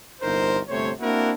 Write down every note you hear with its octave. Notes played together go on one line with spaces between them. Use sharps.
G1 C2 D#4 A#4 C5
G1 C3 A3 C5 C#5
A#3 C4 D4 E4 F#4 A#4